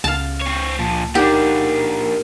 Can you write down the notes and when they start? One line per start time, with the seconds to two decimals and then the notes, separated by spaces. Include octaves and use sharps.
0.04 C#2 C#3 F5 A5
0.42 C4 C#5
0.79 A#2 F3 A5
1.15 A#2 D4 D#4 G4 A#4 F#5